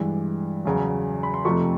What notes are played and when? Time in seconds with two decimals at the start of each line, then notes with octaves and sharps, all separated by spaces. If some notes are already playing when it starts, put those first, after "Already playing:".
Already playing: G2 E3 G#3
0.65 E2 C#3 F#3
1.23 B5
1.34 C6
1.45 F2 C3 F3 A3 C#6